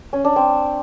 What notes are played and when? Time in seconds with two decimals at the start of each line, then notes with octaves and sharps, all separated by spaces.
0.13 C#4
0.24 D4
0.36 C4